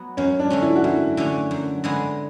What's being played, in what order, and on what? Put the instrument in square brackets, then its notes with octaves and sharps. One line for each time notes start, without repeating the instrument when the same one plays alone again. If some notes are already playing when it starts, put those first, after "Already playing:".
Already playing: [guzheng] F#3 B3
[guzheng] F#2 [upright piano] C#4
[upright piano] D4
[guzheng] D3 A3 C#4
[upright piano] E4
F#4
[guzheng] F#2 [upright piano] E4
[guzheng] D3 A3 C#4
F#2
D3 G#3 B3